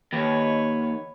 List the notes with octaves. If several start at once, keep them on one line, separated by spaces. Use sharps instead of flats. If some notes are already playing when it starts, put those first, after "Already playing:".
D#2 B4 C#5